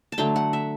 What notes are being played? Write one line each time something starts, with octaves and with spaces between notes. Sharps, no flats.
A5
D3 F#3 A3 G5
F#5
E5